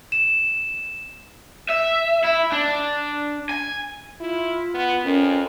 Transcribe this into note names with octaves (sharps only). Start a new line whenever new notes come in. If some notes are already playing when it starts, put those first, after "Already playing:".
E7
E5
E4
D4
G#5
E4 F4
B3
F2 C#4 A#4